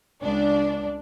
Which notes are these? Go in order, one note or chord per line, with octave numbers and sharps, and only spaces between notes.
C#2 D4